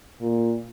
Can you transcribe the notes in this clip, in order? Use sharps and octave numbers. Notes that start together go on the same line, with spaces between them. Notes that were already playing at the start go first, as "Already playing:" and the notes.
A#2